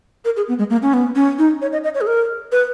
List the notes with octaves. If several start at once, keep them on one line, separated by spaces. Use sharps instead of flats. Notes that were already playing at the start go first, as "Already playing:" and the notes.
A#4
G#4
B3
G#3
A#3
C#4
B3
C#4
D#4
C#5
D#5
D#5
C#5
G#4
A#4
B4